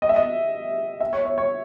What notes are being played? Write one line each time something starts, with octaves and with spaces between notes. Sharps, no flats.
D#5
E5
D#5
E5
C#5
C#5
C#5